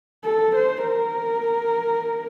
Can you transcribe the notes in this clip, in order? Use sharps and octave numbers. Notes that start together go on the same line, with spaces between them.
A4
C5
A#4